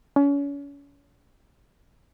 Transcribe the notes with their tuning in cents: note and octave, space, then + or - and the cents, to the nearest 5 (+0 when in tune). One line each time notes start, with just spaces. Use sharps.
C#4 +35